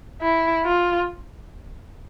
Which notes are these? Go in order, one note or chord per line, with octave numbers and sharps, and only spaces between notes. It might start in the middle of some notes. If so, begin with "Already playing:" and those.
E4
F4